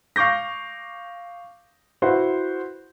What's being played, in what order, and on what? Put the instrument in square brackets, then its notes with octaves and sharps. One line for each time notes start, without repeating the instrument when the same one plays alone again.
[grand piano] F5 C#6 D6 G6 A#6
E4 F#4 B4 C5 F#5